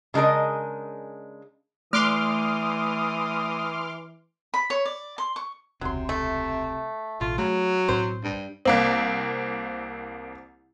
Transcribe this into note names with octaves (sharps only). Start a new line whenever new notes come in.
C#3 G#3 D4 A#4 D#5
E3 A3 C6 D6 D#6 F6
B5
C#5
D5
C6
C#6
E1 C#2 C3 F#3 C6
A3
A1 B2 A3 F4
C#3 F#3 A3
B1 A2 C4 C5
G2
C2 A#3 C4